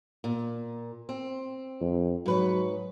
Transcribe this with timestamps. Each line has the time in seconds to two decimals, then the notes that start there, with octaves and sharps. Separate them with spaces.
0.24 A#2
1.09 C4
1.81 F2
2.26 G#2 F#3 B4 C#5